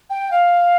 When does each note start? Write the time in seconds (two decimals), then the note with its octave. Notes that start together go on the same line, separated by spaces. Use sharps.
0.10 G5
0.31 F5